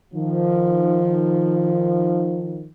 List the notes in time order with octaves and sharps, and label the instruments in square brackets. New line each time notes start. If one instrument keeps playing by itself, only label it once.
[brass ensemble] D#3 F3